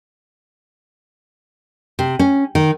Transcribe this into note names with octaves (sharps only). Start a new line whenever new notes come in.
C3
C#4
D#3